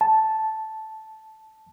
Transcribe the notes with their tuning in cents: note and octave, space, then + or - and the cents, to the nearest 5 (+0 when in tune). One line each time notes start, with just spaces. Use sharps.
A5 -5